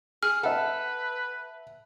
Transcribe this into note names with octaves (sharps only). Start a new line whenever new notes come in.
G#4 F6
A4 B4 E5 F#5